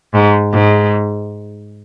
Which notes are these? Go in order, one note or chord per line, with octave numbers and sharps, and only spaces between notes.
G#2
G#2